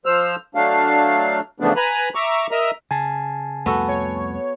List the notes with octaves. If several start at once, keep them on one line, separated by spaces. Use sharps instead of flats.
F3 C5 E6 F6
F#3 A3 D4 F5
C#3 E3 F3 A3 B3 D4
B4 G#5 A#5 B5
E5 A#5 C#6 D6
A#4 D#5 E5 A#5
C#3 G#5 A5
C2 F2 A3 B3 F#4 A4
C#5